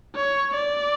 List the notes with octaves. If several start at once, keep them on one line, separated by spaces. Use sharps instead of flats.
C#5
D5